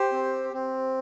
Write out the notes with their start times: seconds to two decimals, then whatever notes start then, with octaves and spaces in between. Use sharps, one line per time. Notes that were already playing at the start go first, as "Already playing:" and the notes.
Already playing: G4 C5
0.12 C4
0.53 C4